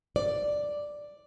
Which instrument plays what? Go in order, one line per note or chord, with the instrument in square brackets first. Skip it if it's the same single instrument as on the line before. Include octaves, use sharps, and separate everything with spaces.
[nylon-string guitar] D5